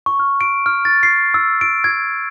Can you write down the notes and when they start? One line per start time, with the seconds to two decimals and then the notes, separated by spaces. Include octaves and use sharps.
0.06 C#6
0.20 F6
0.41 D7
0.66 F6
0.85 A6
1.03 C7
1.34 E6
1.61 D7
1.84 G#6